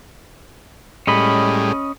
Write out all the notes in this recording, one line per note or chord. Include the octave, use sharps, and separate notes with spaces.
A2 G3 G#3 C#4 D#5 B5